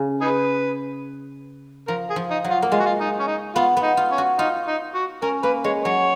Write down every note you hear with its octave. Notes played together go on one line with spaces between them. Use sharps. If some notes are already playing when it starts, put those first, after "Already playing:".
Already playing: C#3
D#4 G#4 B4
F3 A#4
G#4
F3
D#4
F#3
F4
A#3
G#3 F4
F#4
F4
D#4
C#4
D#4
B3 F4
B3
D#4
F4
C#4
F#4
D#4 F4
D#4
F#4
C#4 A#4
A#3 B4
G#3 C#5
F#3 C#5